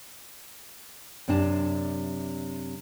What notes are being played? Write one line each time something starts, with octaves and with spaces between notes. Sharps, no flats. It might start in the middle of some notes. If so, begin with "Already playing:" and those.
F#2 C3 D4 A5